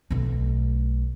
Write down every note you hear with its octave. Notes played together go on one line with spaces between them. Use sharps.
B1 A3